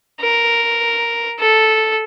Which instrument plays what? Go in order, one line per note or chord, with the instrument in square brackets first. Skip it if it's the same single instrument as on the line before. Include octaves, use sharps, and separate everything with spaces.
[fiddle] A#4
A4